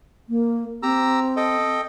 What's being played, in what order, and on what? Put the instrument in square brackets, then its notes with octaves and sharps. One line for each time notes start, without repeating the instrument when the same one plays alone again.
[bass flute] A#3
[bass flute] C4 [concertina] G4 A#5 E6
[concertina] A4 D#5 G5